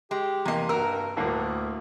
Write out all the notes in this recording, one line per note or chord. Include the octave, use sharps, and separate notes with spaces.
G#3 G4
E2 C3 A#3 D#5
G2 F#4 A#4 E6
D2 A2 D3 A#3